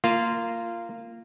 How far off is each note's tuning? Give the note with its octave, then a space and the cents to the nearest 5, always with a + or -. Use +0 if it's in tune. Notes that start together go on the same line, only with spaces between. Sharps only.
A#3 -15 F4 -15